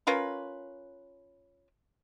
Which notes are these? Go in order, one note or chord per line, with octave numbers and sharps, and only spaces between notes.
C#4 F4 A#4 B4